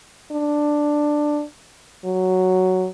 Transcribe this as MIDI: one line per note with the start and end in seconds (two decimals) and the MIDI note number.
0.32 1.43 62
2.05 2.88 54